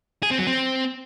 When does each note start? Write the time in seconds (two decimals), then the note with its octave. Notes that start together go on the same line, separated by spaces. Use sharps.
0.23 G#4
0.31 C4
0.39 F#3
0.47 C4